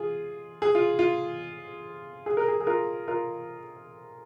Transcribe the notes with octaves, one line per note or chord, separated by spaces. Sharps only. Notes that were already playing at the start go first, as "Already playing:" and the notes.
Already playing: F4 G#4
G#4
F4
F4
G#4
A#4
G#4
G#4
F4 A#4
F4 A#4